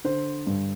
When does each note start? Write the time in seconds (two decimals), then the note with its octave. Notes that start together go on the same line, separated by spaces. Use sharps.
0.04 D3 C5
0.47 G2